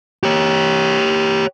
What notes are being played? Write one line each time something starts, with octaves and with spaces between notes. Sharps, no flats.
G4 C#5